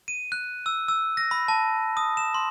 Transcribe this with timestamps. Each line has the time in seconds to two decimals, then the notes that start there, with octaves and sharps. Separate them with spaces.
0.08 D#7
0.32 F#6
0.66 E6
0.88 E6
1.17 A#6
1.31 B5
1.48 A5
1.97 D#6
2.17 E7
2.34 C6